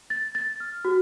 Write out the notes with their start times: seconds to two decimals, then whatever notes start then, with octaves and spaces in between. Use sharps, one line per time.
0.10 A6
0.35 A6
0.60 F6
0.85 F#4